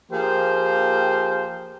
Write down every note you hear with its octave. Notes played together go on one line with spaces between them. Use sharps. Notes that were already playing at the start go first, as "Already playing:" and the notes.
F3 A#3 G4 G#4 A#4 C5